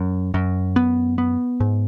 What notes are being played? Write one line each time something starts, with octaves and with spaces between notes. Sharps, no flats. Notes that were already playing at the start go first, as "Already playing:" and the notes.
Already playing: F#2
F#2
B3
B3
G#2